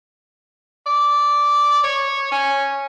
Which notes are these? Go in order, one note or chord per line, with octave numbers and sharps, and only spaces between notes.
D5
C#5
C#4